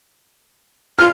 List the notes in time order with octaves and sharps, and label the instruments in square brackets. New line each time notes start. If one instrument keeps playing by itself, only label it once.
[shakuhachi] F4 [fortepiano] F6